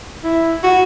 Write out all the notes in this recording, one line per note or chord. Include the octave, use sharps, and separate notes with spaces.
E4
F#4